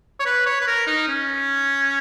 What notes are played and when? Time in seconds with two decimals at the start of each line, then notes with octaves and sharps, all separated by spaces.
0.20 C#5
0.26 B4
0.46 C#5
0.61 B4
0.67 A#4
0.87 D#4
1.09 C#4